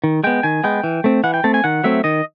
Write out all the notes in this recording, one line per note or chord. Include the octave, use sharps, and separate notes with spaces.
D#3
G#3 B3 G5
D#3 G#5
G#3 B3 G5
E3
A3 C4
E3 F#5
G5
A3 C4 A5
G#5
D#3 F#5
F#3 A3 C4 E5
D#3 D#5